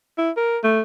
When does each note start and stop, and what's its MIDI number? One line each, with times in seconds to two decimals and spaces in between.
0.18 0.31 64
0.37 0.58 70
0.64 0.81 57